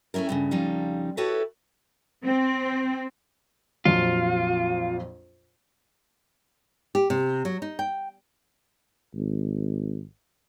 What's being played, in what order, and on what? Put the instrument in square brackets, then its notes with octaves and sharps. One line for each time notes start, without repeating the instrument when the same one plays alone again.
[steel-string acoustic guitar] A3 C#4 D4 E4 A#4
G2 A#2 C#3
F2 C#3 F3 G3 D#4 F5
E4 F#4 G4 A4 B4 C#5
[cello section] C4
[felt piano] A#1 F2 F#3 [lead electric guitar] F4
[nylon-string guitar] G4
C3
F#3
D#4
G5
[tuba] G#1